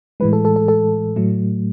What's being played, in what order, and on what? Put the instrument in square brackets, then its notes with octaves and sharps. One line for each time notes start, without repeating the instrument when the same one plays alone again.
[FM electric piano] A2 E3 G#3 B4
A4
A4
A4
A4
A2 F#3 A3